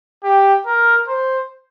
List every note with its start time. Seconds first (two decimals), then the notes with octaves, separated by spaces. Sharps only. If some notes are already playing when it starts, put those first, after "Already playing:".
0.24 G4
0.66 A#4
1.08 C5